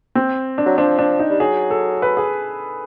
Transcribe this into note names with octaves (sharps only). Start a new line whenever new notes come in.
C4
D4
F#3
F3 D4
D4
D#4
G3
F#3 G#4
A4
B4
G#4